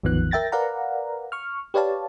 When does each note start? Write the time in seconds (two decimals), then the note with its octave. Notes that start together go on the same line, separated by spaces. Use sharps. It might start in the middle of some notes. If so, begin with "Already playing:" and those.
0.03 A1 E2 D#3 F3 B3 F#6
0.31 A#4 E5 G5 A6 A#6
0.52 A#4 B4 D5 F5 F#5 A#5
1.32 C#6 F6
1.74 G4 B4 C#5 D5 F5 A5